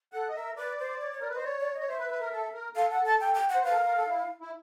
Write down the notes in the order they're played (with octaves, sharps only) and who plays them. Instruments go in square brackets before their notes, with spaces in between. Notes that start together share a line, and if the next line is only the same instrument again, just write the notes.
[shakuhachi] A4 [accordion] F#5
[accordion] D#5
[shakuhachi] A#4 [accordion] E5
[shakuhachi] B4 [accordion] D5
[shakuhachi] C5
C#5
C#5
[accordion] A#4 [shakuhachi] D5
[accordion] B4
[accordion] C5 [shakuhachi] D#5
[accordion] C#5 [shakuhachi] D5
[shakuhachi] D5
D#5
[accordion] C#5
[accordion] C5 [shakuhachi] E5
[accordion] B4
B4
A#4
A4
A#4
[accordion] A4 [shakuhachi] F5
[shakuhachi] F#5
A5
G5
G5
F#5
[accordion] C5
[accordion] B4 [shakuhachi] F5
[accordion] A4
A#4
A#4
A4
E4
E4